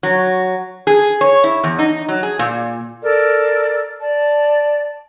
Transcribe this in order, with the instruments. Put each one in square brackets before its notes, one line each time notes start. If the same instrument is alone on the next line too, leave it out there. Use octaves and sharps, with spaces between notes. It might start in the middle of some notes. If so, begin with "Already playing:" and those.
[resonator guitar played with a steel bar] F#3
G#4
C#5
E4
E2
D#4
F#3
G#4
A#2
[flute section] A4 A#4 D5
D5 A5